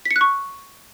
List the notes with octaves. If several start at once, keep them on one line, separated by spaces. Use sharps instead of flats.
B6
C#7
F#6
C#6